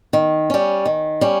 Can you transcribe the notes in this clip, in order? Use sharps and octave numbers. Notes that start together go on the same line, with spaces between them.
D#3
G3 C#4
D#3
G3 C#4